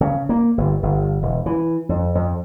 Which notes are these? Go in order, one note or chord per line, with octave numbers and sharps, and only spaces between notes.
C#3
A#3
G1
G1
E1
E3
F2
F2